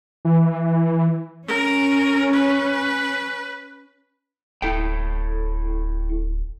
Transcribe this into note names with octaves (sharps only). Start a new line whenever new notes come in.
E3
C#4 A#4
B4
D1 E4 A4 G5